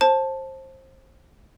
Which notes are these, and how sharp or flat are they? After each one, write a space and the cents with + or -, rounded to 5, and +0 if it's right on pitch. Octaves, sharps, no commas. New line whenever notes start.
C5 +25 A5 +0